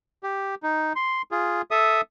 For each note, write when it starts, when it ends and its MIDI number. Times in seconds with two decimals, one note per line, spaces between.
0.23 0.55 67
0.63 0.93 63
0.96 1.22 84
1.31 1.62 65
1.31 1.62 68
1.71 2.01 69
1.71 2.01 76
1.71 2.01 87